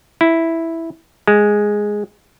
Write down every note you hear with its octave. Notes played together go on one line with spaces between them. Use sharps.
E4
G#3